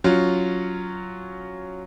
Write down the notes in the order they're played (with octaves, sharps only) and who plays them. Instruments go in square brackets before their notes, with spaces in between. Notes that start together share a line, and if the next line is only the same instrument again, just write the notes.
[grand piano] F#3 C#4 F4